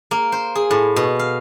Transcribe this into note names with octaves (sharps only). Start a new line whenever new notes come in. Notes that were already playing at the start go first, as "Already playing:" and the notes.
A#3
C5
G#4
A2
B2
F5